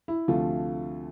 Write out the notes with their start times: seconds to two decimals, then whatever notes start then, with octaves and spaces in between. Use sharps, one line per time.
0.08 E4
0.28 D2 C3 F3 A3 F4